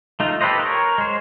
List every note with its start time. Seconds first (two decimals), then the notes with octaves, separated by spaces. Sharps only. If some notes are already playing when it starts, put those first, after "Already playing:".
0.20 A3 D#4 F4
0.41 G4 A4 B4 C5 D#5
0.59 A#4 C#5
0.98 G#3 C5